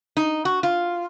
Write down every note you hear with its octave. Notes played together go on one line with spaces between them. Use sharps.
D#4
F#4
F4